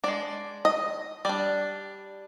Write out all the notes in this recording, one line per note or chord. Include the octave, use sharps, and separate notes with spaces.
G#3 D4 D5
D#5
G3 D4 D5